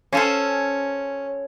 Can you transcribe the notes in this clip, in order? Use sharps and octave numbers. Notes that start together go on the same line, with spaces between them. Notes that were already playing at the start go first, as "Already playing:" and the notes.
C#4 F4 A4 C5